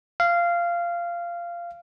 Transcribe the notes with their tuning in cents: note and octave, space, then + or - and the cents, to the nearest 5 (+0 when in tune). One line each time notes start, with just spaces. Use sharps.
F5 -15